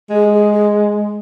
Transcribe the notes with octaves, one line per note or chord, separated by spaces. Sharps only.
G#3 G#4
G#4
G#4